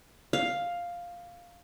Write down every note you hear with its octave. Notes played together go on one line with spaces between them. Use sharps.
F5